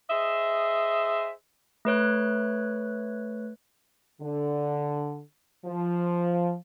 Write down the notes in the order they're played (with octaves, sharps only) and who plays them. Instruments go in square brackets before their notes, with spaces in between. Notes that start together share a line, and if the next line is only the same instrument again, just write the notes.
[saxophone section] G#4 C5 D#5 E5
[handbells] A3 B4 C#5 F#6
[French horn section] D3
F3